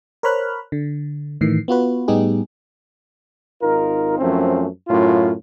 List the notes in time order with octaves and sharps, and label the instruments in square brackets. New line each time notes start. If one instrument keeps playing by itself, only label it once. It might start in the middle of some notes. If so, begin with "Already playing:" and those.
[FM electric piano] A#4 C5 C#5 B5 F6 F#6
D3
A2 D#3 E3 C7
B3 F4 F#4 B4
A2 G3 B3 D#4 G4 G#4
[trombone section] G#1 D#4 F4 A#4
F#2 F3 A3 C4 C#4
F#2 A2 F4